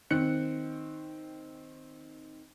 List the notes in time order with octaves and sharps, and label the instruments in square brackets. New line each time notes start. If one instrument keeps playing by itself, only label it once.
[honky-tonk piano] D#3 C4 F#6 C#7